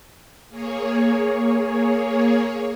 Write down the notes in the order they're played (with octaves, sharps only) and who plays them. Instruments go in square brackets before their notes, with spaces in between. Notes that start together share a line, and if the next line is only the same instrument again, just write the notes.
[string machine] A#3 G#4 C#5